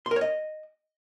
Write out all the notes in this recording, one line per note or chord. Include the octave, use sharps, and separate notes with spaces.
C6
A#4
C#5
D#5